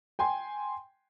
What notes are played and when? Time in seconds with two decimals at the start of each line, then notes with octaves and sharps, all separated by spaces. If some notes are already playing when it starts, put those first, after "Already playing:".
0.19 G5 G#5 C6